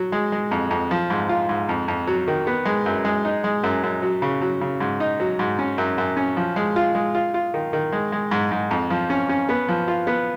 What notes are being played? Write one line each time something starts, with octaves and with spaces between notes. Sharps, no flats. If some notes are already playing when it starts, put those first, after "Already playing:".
Already playing: F#3
G#3
G#3
F2
F2
F3
G#2
F4
G#2
F2
F2
F#3
D#3
B3
G#3
F#2
G#3
D#4
G#3
F#2
F#2
F#3
C#3
F#3
C#3
G#2
D#4
F#3
G#2
C#4
F#2
F#2
C#4
F3
G#3
F4
G#3
F4
F4
D#3
D#3
G#3
G#3
G#2
G#2
F2
F3
C#4
C#4
B3
F3
F4
B3